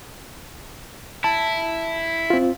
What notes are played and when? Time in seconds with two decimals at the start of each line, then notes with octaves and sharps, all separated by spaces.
1.24 E4 A5
2.30 C4 F4